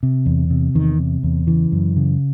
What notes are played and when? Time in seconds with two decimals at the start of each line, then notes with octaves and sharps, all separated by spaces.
0.03 C3
0.26 E2
0.50 C3
0.75 E2 D#3
0.99 C3
1.23 E2
1.47 C#3 E3
1.72 F#2
1.96 C#3